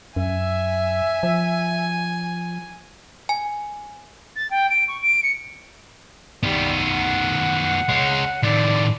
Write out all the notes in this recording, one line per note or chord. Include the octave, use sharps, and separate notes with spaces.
F#2 E5 G#5
F3
G#5
A6
G5
D7
C#6
D7
C#7
D#3 G3 B3
F#5
G#3 C#4
A2 D#3 D5